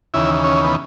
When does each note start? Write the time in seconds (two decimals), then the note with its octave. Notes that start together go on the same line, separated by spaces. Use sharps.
0.14 D#2 C#3 E3 E4
0.44 C#4
0.64 B3